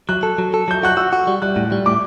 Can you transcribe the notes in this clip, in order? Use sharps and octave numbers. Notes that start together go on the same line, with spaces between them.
F#3 F#6
A4
F#3
A4
F#3 G6
F#4 F#6
F#4 E6
F#4
G3
G3 F#6
A2
G3
A2 D6